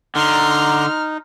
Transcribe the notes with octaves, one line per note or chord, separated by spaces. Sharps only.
D3 D#4 A#5 C6 F6